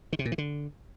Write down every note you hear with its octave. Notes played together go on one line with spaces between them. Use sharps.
D#3
C3
A#2
E3
D3